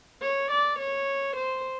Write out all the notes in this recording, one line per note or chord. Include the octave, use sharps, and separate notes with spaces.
C#5
D5
C#5
C5